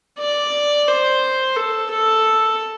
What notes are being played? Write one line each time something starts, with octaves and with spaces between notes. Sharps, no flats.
D5
C5
A4
A4